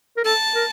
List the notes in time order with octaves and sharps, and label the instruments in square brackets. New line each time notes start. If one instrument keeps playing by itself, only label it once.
[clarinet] A#4
[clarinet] A4 [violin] A5
[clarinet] A#4